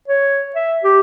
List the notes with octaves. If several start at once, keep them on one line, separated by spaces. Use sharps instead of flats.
C#5
E5
G4